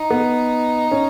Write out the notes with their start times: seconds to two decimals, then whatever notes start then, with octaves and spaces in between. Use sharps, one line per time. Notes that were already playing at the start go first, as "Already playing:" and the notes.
Already playing: D#4
0.10 B3
0.91 C#4